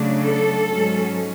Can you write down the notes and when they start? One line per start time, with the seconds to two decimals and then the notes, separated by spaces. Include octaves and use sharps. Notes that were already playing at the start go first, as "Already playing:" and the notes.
Already playing: C#3 F#3 A3 D4
0.24 A4
0.68 G#2 F#3 C#4